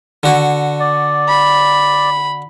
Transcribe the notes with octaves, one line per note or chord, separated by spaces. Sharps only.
D3 F#4
D5
B5